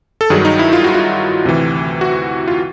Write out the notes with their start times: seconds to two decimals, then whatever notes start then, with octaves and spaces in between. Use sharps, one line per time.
0.21 A4
0.30 G2 D#3 F#3 G#4
0.45 D#4
0.59 E4
0.73 F4
0.84 F#4
0.94 F4
1.45 D2 C3 E3
2.01 F#4
2.48 F4